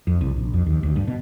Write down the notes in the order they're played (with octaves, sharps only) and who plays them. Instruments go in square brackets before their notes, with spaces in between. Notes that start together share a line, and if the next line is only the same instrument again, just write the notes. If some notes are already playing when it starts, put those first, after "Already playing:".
[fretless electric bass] F2
C2
A#1
F2
D#2
D2
G2
B2